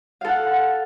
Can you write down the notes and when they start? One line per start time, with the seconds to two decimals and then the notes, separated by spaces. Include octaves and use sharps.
0.21 F5
0.25 A4
0.28 F#5